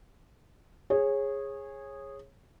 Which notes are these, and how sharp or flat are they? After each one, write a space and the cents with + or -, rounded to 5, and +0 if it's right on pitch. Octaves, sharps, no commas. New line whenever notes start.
G#4 -10 C#5 -20